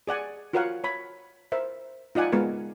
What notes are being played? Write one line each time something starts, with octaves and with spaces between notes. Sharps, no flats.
G#4 D5 F#5 G#5
F4 F#4 A#4 C#5 F5 F#5
C#5 B5
A#4 C5 E5
D#4 F4 D5 F#5 G#5
G#3 B3 F4 A#4